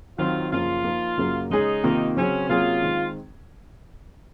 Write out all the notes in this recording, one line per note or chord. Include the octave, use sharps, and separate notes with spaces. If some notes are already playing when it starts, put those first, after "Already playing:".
D#3 F#3 C4 F4
F#2 C#3 F3 A#3 F4
F3 A#3 D#4
F#2 C#3 F#3 A#3
C#3 G#3 C#4 D#4 G#4
C3 D#3 A#3 F4
C#3 F#3 C4 C#4
C3 F#3 A#3 C#4 F4 G#4
D#3 G#3 C4